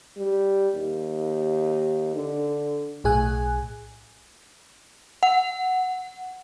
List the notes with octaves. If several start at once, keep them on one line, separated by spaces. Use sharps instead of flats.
G3
D#2
D3
B1 A2 G#4 G#5 F#6
F#5